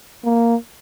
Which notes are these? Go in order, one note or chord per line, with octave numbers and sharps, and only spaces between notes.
A#3